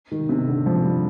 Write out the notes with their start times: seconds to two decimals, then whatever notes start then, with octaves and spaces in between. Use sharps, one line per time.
0.12 D#3
0.29 C3
0.47 D3
0.66 F3
0.83 G3